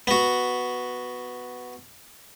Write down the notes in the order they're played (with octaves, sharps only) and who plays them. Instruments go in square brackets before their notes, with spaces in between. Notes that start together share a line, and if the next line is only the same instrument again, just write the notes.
[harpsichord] B3 F#4